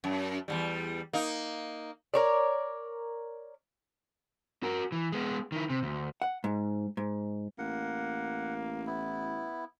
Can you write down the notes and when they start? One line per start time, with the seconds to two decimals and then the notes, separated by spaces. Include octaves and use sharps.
0.04 F#2
0.48 E2 G#2 G3
1.13 A#3 D#4
2.14 A#4 C#5 D5
4.63 F#4 A#4
4.92 E3
5.12 G#3 B3
5.52 D#3 E4
5.70 C3
5.83 D2
6.22 F#5
6.44 G#2
6.97 G#2
7.59 A1 A#3 F#5
8.87 B3 E4